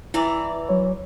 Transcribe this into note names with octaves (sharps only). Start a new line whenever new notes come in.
E3 E4 D5 A#5
F#3 C#5